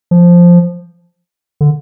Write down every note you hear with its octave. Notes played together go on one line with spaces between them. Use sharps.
F3
D3